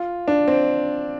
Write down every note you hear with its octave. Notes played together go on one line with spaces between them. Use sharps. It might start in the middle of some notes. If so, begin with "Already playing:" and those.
Already playing: F4
D4
C4